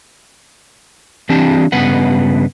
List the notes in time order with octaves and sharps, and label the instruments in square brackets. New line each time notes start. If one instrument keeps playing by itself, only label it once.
[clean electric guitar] C3 E3 C4 D4 G4 A5
G2 C#3 B3 B4 F#5